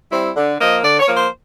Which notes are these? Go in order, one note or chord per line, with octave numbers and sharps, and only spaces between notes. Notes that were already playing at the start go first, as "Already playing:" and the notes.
G3 C4 E4
D3
F3 A#3 D#5
D3 D5
C#5
F3 A#3
C5